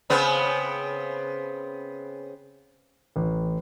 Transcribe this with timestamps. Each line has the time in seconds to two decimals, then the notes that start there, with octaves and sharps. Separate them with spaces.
0.10 C#3 B3 C4
3.16 A1